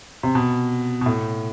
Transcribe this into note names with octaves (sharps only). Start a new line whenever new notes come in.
C3
B2
B2
A2